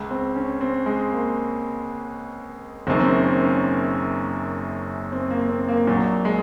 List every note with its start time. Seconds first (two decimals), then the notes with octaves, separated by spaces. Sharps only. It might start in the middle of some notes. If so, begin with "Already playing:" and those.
Already playing: C#2 C#3
0.11 C4
0.35 C#4
0.61 C4
0.86 G#3
1.12 A#3
2.87 F#1 F#2 D#3 C4
3.00 C4
3.05 C#4
3.24 C4
3.43 C#4
5.12 C4
5.30 A#3
5.49 C4
5.68 A#3
5.87 A#1 A#2 F#3
6.25 G#3